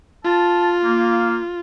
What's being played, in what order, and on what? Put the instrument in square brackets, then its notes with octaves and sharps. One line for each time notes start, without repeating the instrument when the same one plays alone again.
[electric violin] F4 [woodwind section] A5
[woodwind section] A#3